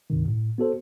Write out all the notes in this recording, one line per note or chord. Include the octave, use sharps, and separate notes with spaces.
C#2 G2 C3 D#3
A2
B3 F#4 A4 C5